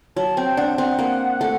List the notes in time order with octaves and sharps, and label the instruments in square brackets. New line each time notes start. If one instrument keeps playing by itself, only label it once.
[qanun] F#3 [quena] A5
[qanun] C4 [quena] G5
[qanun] D4 [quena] F#5
[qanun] C4 [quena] F#5
[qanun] A#3
A3